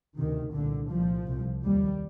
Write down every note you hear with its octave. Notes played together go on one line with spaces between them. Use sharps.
D2 C3 D#3
C2 A#2 D3
C2 A#2 F3
C2 C3
D#2 G3